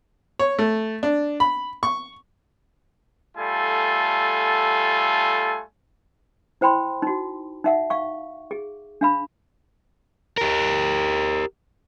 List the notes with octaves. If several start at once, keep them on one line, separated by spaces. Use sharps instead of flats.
C#5
A3
D4
B5
C#6
G3 A3 F4 A4 G#5
E4 C5 G5 B5 C6
D#4 F#4
D#4 E5 F#5
F5 C#6
G#4
D4 F5 B5
G4 A#4